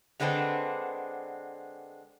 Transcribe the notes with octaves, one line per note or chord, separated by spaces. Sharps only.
D3 G#3 B3 C4 D4